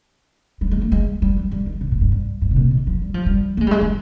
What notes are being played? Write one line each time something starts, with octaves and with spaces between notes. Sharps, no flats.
G3
G#3
A#3
G#3
G3
F3
G3
D#3
C3
A#2
G2
G2
G2
C3
A#2
D#3
F3
G3
F3
G3
A#3
G#3
G3
G#3
G#3